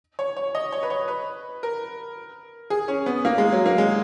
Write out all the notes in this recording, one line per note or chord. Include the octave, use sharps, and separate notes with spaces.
C#5
C#5
D#5
C#5
B4
C#5
B4
A#4
G#4
C#4
B3
A#3
G#3
F#3
A#3
G#3